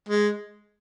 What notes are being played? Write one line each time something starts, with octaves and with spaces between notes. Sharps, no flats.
G#3